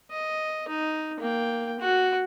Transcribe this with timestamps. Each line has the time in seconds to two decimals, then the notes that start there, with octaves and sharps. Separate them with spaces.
0.11 D#5
0.68 D#4
1.20 A#3 G5
1.80 F#4